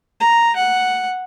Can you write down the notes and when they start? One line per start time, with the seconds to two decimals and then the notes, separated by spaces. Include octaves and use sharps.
0.20 A#5
0.56 F#5